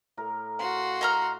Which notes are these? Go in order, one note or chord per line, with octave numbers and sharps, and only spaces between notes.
A2 A#4
F#4 F5 C6
D#5 A#5 F6